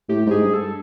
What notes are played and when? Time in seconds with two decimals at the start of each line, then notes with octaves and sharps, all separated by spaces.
0.09 A2 G4
0.26 G#2
0.31 G#4
0.42 G2
0.53 A4